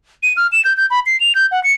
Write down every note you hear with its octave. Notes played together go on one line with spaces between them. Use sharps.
D#7
F6
E7
G6
G6
B5
C7
F7
G6
F#5
C#7